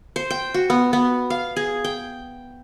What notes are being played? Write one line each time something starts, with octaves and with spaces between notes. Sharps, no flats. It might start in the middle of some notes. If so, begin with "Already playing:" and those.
C5
G5
F#4
B3
B3
F5
G#4
G5